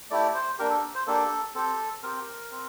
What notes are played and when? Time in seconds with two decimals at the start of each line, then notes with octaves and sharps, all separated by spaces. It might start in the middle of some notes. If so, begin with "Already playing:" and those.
0.11 A3 E4 G4 D5
0.35 C5
0.59 A#3 D4 G4 A#4
0.70 A4
0.95 C5
1.07 A#3 D4 G4 A4
1.55 C4 G4 A4
2.03 C4 G4 A#4
2.51 C4